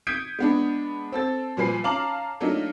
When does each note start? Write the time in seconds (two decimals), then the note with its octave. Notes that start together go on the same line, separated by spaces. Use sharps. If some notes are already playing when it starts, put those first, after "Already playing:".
0.07 D#6 G6 G#6 B6 C#7 D7
0.39 G#3 B3 D4
1.12 C4 A4 A6
1.57 A#2 F3 G3 B4 G#5 C7
1.84 C#4 F5 A5 A#5 D6 F#7
2.41 F#3 A3 A#3 D4 D#4 F4